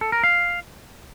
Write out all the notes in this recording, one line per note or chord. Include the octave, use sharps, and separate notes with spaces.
A4
A#4
F5